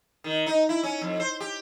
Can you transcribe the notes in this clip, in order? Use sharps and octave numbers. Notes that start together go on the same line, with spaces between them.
D#3
D#4
E4
C#4
F2
C5
G4